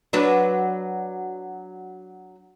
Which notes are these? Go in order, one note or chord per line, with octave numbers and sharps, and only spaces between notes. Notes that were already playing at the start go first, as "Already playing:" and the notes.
F#3 D4 B4